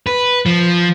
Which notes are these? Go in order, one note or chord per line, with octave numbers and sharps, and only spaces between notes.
B4
F3